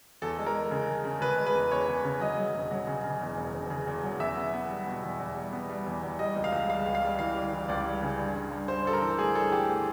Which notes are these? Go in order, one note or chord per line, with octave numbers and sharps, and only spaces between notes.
E2 A4
G#3
A#4
G#3
C#3
G#3
C#3
C#3 B4
G#3
B4
E2
E2 C#5
E2
C#3
F#3 D#5
F#3
E1
F#3
C#3
C#3
E2
E1
E1
C#3
E2
F#3
E2 E5
B3
B3
G3
B2
E2
E2
G3
B3
G3
E2
E2
G3 D#5
C#2
F5
C#2
G3 F5
C#2
F5
G3
E3 F5
G3
E3
C#2 D5
G3
C#3
G2
G2
G2
G2 C5
G2 A4
A#4
E3
A3 G#4
G2 A4
E3 G4
A3